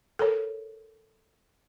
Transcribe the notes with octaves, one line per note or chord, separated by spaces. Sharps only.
A4 A#4 C#5